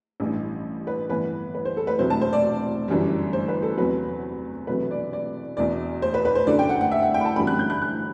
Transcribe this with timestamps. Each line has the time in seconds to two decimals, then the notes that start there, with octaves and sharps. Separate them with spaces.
0.20 A1 G2 E3
0.87 B4
1.09 G1 G2 E3 B3 D4 B4
1.55 B4
1.65 C5
1.77 A4
1.87 B4
1.99 E1 D2 C3 F#3 C5
2.10 A5
2.21 C5
2.33 D5
2.88 G1 F#2 E3 G3
3.33 C5
3.48 B4
3.63 A4
3.78 E2 C3 F#3 B4
4.67 E1 E2 C3 F#3 A3 B4
4.91 D5
5.13 D5
5.57 E1 E2 B2 D5
6.02 C5
6.14 B4
6.25 B4
6.35 C5
6.46 G1 F#2 D3 A3 D4 D5
6.59 G5
6.69 F#5
6.81 F#5
6.91 E5
7.02 F#5
7.14 G5
7.21 B5
7.25 A5
7.36 G1 F#2 E3 G3 C4 B5
7.47 F#6
7.59 G6
7.70 F#6
7.82 F#6